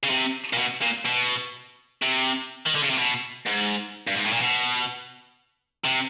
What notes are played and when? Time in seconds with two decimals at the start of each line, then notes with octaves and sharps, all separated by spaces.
0.03 C#3
0.10 C3
0.53 A#2
0.58 B2
0.82 A#2
1.06 B2
2.02 C3
2.66 D#3
2.75 D3
2.82 C#3
2.90 C3
2.98 B2
3.46 G#2
4.07 G2
4.16 G#2
4.25 A2
4.33 A#2
4.41 B2
5.85 C3